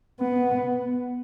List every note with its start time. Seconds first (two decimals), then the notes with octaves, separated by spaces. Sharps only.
0.20 B3